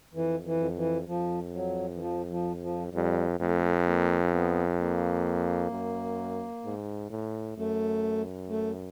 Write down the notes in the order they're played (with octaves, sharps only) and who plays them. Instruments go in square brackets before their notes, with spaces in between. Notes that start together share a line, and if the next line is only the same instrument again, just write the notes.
[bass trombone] F2 [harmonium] E3
[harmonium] E3
[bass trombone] F2
[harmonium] E3
[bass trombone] F2 [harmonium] F3
[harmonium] F#3
E3
F3
F3
F3
[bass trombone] F2 [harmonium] G3
[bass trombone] F2 [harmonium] A3
[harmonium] A#3
B3
A#3
[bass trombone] F#2
G#2
A2
[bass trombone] F#2 [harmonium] A3
[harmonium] A3